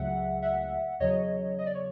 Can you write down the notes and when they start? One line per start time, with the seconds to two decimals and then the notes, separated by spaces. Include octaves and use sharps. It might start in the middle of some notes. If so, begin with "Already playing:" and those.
Already playing: C#2 C#3 F#3 A3 E5 F#5
0.42 E5 F#5
1.00 E2 C#3 F#3 C#5 D#5
1.59 D#5
1.66 D5
1.75 C#5